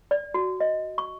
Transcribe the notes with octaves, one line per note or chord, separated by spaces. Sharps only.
D5
F#4
D#5
C#6